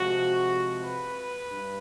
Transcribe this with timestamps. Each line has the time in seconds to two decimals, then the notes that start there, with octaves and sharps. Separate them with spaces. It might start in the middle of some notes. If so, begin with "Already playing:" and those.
Already playing: C3 F3 G#3 F#4
0.83 B4
1.50 G2